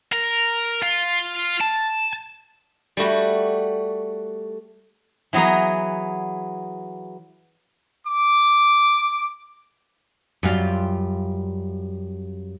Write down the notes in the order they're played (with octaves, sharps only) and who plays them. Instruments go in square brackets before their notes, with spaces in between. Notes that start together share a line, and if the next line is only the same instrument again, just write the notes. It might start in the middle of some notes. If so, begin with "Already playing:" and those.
[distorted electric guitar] A#4
F4
A5
[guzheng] G3 A3 F#4
E3 F#3 B3 G#4 A#5
[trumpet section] D6
[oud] F#2 G3 F4